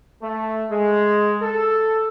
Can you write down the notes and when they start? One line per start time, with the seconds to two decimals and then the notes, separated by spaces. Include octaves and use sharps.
0.22 A3
0.70 G#3
1.41 A4